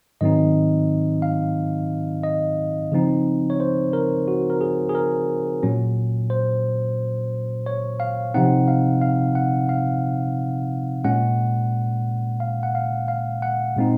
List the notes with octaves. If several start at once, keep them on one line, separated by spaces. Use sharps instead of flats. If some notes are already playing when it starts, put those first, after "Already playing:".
G#2 D#3 F#3 C4 D#4 D#5
F5
D#5
C#3 F3 C4 D#4
C#5
C5
A#4
F#4
A#4
G#4
G#4
A#4
A#2 F#3 C#4
C5
C#5
F5
C3 F3 C4 D#4 F#5
F5
F5
F#5
F5
A#2 G#3 C#4 F#5
F5
F#5
F5
F5
F#5
A#2 G#3 C4 D#4